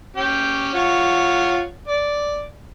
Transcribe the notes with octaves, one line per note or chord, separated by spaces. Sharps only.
C#4 G4 G5
F4 C#5 F#5
D5